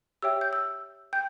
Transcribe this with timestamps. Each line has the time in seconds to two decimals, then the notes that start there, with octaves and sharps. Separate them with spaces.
0.22 G4 C#5 E5 G5 E6
0.41 G6
0.53 E6
1.13 G5 G6